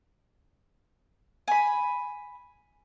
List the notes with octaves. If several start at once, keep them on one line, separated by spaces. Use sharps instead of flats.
G#5 B5